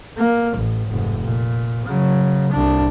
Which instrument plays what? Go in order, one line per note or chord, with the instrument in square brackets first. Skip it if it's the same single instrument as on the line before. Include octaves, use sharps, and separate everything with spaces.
[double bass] A#3
A1
F1 G#2
A#2
C#3 F#3
C2 D4